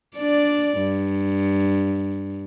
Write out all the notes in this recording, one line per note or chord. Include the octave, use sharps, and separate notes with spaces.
D4 D5
G2